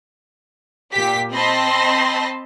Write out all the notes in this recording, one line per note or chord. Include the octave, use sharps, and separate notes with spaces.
A#2 G4 B6
C4 D#5 A5 B5 C6 A#6